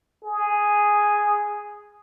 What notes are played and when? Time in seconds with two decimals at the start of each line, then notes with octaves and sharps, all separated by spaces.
0.24 G#4